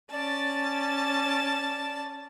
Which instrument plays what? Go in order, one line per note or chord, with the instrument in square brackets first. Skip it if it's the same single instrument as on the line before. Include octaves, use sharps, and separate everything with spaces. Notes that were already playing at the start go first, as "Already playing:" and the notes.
[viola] C#4 [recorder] D5 [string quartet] A5